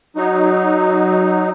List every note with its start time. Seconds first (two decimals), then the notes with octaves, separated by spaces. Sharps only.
0.16 F#3 D#4